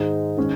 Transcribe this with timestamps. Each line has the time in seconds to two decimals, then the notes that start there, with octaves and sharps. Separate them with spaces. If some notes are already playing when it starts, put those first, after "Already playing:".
Already playing: G#2 D#3 G#3 D#4
0.37 D#3 G#3 C#4